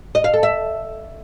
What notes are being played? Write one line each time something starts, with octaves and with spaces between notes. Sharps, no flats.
D#5
F5
A4
E5